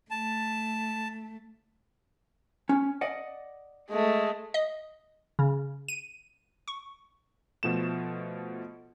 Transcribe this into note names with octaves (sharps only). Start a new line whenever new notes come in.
A3 A5
C#4
D5 D#5 F#5
G#3 A3
D#5
C#3
D#7
C#6
B2 F3 A3 E7